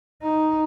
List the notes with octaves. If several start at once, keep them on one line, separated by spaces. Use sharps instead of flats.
D#4